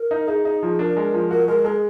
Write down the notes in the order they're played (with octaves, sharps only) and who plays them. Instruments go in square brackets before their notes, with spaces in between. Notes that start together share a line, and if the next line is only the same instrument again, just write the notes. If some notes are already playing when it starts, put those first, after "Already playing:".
Already playing: [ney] A#4
[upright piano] D#4
[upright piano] D#4 [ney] G#4
[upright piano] D#4
F3
[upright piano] D4 [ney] A#4
[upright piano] G#3
F3
[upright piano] F#4 [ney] A#4
[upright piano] G#3 [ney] A#4
[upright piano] G#3 [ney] G#4